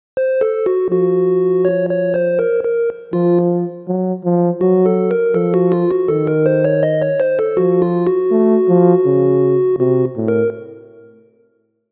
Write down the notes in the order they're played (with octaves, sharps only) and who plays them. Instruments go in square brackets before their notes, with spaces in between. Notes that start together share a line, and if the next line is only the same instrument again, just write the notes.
[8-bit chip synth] C5
A4
F#4
[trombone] F3 [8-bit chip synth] F#4
[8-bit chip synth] C#5
C#5
C5
A#4
A#4
[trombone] F3 [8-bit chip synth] F4
[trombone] F#3
F3
[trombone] F#3 [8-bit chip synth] F#4
[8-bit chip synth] A4
A#4
[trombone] F3 [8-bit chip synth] A4
[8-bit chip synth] F#4
F4
F#4
[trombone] D#3 [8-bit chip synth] A4
[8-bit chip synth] A#4
C5
C#5
D#5
C#5
C5
A4
[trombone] F3 [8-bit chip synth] F#4
[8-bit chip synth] F4
F#4
[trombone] A3
F3
C#3
[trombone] C3 [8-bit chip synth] F#4
[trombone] A2
[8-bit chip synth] A#4